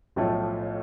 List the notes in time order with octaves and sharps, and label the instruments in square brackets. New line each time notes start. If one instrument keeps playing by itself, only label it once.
[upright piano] B1 A2 F3 A3